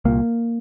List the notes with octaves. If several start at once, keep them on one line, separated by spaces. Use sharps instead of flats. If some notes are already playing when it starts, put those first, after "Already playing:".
C2 A#2 A#3